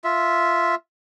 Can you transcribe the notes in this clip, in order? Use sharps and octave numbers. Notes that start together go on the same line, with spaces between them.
F4 E5